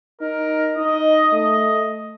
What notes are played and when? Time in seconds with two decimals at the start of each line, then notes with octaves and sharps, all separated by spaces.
0.21 D#4 A#4
0.77 D#4 D#5
1.33 A3 D#5